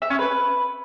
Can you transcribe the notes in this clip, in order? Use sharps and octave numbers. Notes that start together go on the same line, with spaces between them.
E5
C#4
B4